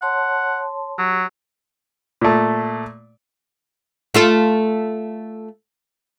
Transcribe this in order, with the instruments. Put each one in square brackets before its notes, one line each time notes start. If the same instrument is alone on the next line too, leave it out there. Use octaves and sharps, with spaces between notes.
[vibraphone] C#5 A5 C6 [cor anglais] F#5
[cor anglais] F#3 [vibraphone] G4
[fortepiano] A#2 A3
[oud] A3 F4 A4